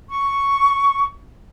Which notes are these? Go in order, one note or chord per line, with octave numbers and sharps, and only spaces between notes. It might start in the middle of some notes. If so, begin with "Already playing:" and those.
C#6